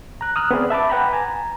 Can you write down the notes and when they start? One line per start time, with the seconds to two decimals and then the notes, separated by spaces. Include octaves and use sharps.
0.21 A#5 F#6
0.36 D#6 F6 F#6
0.51 B3 C4 G#4 D5
0.70 E5 A5 B5 D6
0.89 B4 F#5 G5 A#5 B5
1.13 G#5 A#5